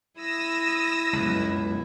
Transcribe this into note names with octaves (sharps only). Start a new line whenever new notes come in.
E4 D#6 E6 A#6
G1 C#2 F#2 B2